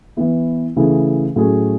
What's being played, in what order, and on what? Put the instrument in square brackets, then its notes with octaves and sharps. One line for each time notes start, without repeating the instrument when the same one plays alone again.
[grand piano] E3 B3 E4
C#3 E3 A3 E4 G#4
A2 F#3 C#4 G#4